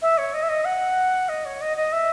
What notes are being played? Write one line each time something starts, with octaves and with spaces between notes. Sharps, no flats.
E5
C#5
D#5
E5
D#5
F#5
D#5
C#5
D#5
D#5
E5